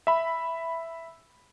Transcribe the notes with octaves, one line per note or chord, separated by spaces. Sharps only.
E5 B5